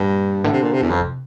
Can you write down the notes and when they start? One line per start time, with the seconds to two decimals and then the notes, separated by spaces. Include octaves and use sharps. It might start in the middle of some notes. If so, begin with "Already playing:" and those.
Already playing: G2 A#2
0.44 A2 D3
0.53 C3
0.63 A#2
0.72 C3
0.82 E2
0.90 F2 D3
1.01 C3